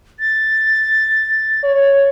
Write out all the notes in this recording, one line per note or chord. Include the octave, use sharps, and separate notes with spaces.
A6
C#5